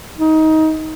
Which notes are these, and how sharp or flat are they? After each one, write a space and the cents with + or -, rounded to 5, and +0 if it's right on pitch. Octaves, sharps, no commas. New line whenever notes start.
D#4 +20